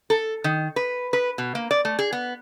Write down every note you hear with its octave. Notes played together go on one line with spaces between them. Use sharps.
A4
D#3
B4
B4
B2
A#3
D5
A3
G#4
B3